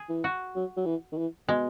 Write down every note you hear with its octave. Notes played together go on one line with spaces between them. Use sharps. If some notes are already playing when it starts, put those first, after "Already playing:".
Already playing: G#4
E3
F#4
F#3
F#3
E3
D#3
E3
B2 G#3